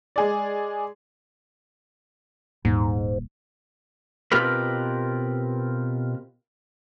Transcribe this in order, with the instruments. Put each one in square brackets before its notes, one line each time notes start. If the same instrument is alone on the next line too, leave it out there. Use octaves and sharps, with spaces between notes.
[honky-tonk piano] G#3 G#4 D5
[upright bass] D#1 [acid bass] G#2
[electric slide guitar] B2 C4 F4 G4 A#4 B4